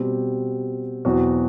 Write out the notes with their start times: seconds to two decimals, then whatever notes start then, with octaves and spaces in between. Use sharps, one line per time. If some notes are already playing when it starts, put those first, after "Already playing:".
Already playing: B2 G3 C4 G4
1.05 E2 B2 F#3 C4 F#4